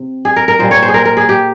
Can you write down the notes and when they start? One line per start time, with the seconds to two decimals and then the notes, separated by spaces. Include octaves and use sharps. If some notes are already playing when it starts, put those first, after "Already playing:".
Already playing: C3
0.25 G#4
0.36 A#4
0.48 A#4
0.59 A#2 G3 C5
0.71 C#5
0.82 C5
0.88 G#4
0.94 A#4
1.05 A#4
1.17 G#4
1.29 G4